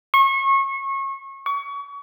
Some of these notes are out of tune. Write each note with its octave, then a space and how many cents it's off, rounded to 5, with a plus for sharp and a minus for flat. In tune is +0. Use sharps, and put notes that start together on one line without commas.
C#6 -30
C#6 +30